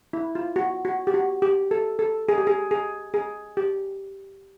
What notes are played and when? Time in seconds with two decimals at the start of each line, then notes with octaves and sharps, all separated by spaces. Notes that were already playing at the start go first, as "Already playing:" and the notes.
0.13 E4
0.35 F4
0.56 F#4
0.85 F#4
1.07 G4
1.14 F#4
1.42 G4
1.71 A4
1.99 A4
2.29 G#4
2.38 G4
2.47 G#4
2.71 G#4
3.14 G#4
3.57 G4